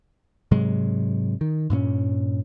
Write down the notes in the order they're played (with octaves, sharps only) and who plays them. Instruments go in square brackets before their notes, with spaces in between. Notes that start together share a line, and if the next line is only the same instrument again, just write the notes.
[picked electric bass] G#2 C3 F#3 G#3
D#3
G2 A#2 A#3 C#4